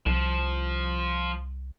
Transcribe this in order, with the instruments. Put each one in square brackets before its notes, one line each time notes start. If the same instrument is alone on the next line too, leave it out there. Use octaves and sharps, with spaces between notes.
[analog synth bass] C2 [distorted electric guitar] F3